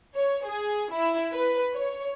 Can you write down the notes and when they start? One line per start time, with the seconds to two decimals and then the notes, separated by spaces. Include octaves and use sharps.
0.15 C#5
0.46 G#4
0.93 E4
1.32 B4
1.75 C#5